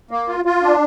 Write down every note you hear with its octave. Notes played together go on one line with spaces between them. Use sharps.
A#3
F4
F4
D4